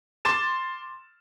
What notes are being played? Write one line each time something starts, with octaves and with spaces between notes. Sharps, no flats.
C6 D6 A6 E7